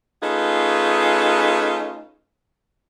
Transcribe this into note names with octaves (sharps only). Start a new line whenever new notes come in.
A3 C#4 D#4 F4 G#4 B4